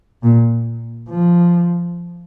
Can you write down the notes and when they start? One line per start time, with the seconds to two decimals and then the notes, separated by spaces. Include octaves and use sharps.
0.23 A#2
1.09 F3